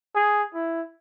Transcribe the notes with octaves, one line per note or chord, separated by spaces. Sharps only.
G#4
E4